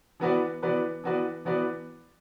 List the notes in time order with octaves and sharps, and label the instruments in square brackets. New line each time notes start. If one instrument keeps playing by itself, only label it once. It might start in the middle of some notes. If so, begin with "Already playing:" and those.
[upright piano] E3 B3 F#4 B4 D5
E3 B3 F#4 B4 D5
E3 B3 F#4 B4 D5
E3 B3 F#4 B4 D5